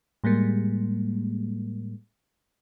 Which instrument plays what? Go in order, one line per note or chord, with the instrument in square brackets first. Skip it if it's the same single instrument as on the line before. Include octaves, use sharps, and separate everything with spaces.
[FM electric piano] A2 G3 G#3 A#3